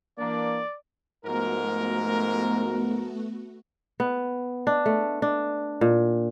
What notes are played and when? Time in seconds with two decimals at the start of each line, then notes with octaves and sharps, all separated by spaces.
0.19 E3 A#3 D4 D5
1.25 G#2 F3 A3 B3 F#4 A#4
4.00 B3
4.67 D4
4.86 A3
5.22 D4
5.81 A#2